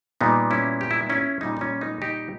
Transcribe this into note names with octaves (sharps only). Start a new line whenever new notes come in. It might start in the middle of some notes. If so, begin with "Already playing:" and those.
A#2 G3 B3 D#4
C#4 E4
G4
E4
D#4
C#4 E4
A#2 G3 C#4 D#4
D#4
C#4
D#4
D#4 G4